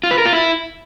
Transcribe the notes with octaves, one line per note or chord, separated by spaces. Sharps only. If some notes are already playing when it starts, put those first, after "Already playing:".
F4
B4
A#4
F4
E4